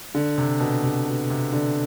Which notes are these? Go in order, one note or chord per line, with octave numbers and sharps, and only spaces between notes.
D3
C3
B2
C3
B2
C3
D3